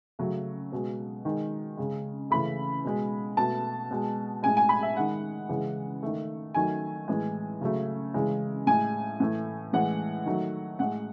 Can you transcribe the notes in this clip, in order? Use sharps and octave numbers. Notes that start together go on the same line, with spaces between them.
C#3 F#3 A3
B2 G#3
D#3 G#3
C#3 G#3
C#3 E3 A3 B5
B2 G#3
B2 A3 A5
B2 G#3
A2 G#3 G#5
G#5
B5
E5
D#3 G#3 F#5
C#3 E3 G#3
D#3 A3
D#3 F#3 A3 G#5
A2 E3 G#3
C#3 F#3 A3
C#3 E3 G#3
A2 G#3 G#5
A2 E3 A3
A2 E3 G#3 F#5
D#3 F#3 A3
A2 G#3 F#5